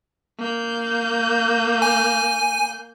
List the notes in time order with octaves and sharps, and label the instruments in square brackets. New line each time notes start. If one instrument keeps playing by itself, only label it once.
[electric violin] A#3 G6
[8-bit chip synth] G#5